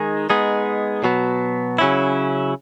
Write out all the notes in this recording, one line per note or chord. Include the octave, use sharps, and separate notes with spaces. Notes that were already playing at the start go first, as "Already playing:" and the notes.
Already playing: D#3 G#3 D#4 G#4
G#3 B3 D#4 G#4
B2 F#3 B3
C#3 F#3 C#4 E4